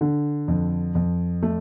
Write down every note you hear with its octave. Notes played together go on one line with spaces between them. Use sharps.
D3
F2
F2
A3